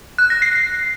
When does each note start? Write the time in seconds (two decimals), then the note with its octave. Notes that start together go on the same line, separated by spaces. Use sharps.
0.18 F#6
0.30 A#6
0.42 C7